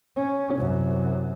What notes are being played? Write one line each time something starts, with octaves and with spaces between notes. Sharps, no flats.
C#4
C2 F#2